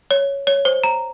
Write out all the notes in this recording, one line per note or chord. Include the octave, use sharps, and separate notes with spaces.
C#5
C#5
C5
A#5